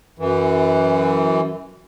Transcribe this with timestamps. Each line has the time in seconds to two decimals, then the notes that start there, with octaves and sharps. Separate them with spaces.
0.19 F#2 E3